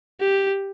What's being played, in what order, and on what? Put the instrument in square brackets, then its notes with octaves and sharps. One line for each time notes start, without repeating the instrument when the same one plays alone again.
[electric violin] G4